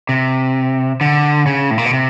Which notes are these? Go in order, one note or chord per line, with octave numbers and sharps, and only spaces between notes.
C3
D3
C#3
A2
A#2
B2
C3